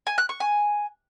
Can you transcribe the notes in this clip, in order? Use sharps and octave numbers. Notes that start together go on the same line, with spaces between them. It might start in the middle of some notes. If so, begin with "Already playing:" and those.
G#5
F#6
C#6
G#5